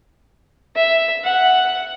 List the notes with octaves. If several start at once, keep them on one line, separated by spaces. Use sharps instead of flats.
E5
F#5